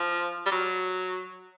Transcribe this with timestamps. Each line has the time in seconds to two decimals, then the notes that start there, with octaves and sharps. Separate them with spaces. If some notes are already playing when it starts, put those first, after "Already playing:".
Already playing: F3
0.46 G3
0.52 F#3